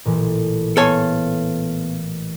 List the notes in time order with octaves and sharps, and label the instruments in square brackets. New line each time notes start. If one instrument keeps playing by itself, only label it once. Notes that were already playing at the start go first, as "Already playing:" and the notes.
[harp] A1 A#2 E3
[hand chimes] B3 [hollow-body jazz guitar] A4 C#5 G#5